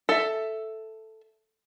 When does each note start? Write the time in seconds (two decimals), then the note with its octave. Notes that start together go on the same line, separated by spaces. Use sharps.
0.09 A4 E5